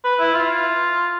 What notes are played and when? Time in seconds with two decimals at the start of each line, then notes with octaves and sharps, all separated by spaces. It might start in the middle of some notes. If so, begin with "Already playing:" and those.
0.04 B4
0.19 E4
0.34 F4